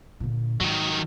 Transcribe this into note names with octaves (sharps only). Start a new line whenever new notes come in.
A#2 D3
G#2 D#3 F#3